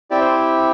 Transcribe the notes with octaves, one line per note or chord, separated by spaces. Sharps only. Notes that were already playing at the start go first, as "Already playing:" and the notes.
C4 E4 G4 D5
C5